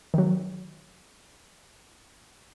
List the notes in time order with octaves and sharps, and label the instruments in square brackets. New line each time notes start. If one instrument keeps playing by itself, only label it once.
[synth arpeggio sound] D#3 F#3